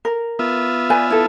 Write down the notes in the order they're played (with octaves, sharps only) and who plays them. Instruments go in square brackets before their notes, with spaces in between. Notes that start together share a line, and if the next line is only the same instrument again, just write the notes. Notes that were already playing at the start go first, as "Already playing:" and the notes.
[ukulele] A#4
[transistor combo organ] B3 F4 E5
[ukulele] B4 D5 G#5
E4 A4